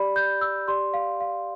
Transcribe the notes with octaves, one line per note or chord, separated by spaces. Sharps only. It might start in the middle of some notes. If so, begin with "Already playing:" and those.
Already playing: G4 D5 B5
G6
E6
G4 D5 C6
F5
F5